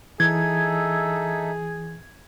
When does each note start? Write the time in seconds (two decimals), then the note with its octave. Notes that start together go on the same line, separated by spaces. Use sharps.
0.20 E3 D#4 G#4 A4 E5 G#6